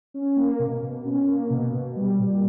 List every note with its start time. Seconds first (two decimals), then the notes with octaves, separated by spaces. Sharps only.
0.14 C#4
0.36 A#3
0.59 B2
0.82 B2
1.05 C#4
1.27 A#3
1.50 B2
1.73 B2
1.96 G3
2.19 A#2